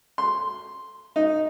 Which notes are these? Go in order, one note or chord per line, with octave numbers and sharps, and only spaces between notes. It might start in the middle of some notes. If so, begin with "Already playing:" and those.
C6
D#4